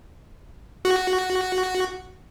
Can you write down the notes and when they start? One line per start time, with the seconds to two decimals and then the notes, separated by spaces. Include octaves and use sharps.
0.85 F#4